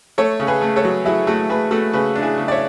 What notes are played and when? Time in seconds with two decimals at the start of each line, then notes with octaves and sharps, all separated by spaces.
0.18 A3 A4 C#5
0.40 C#3
0.47 G#4 B4
0.62 A3
0.76 A4 C#5
0.85 F#3
1.05 F#3 E4 G#4
1.27 A3 F#4
1.50 A3 G#4 B4
1.71 A3 F#4 A4
1.93 C#3 G#4 B4
2.16 D4
2.22 E4 G#4
2.38 C#3
2.48 D5
2.52 C#5 E5